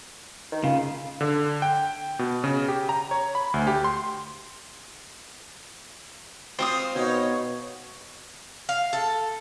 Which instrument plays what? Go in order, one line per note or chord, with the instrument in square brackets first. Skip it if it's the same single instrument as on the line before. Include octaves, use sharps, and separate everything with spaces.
[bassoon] D#3
[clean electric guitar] C#3 [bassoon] F4
[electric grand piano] D3
G5
B2
C#3
G4
A#5
C#5
B5
D2
G4
C6
[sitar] C4 F4 [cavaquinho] C5 C#6 D#6
[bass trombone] B2 [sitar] D#4 [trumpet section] C#5
[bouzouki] F5
A4